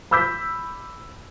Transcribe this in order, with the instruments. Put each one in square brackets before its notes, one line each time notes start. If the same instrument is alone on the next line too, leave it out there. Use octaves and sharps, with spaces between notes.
[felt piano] B5 D6 E6 G6 B6